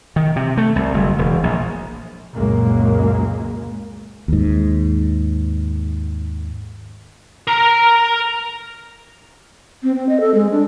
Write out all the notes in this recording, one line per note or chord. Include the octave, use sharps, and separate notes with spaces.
D#3
C3
A3
C2
F#1
E1
A#1
C#2 F#2 A#2 G#3 A#3
D#2 G#2
A#4 A#5
C4
C4
D#5
A4
G#3
D4